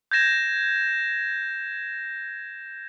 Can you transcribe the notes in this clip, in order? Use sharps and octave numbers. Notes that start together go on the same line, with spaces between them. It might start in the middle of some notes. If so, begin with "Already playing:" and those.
G6 G#6 A#6 E7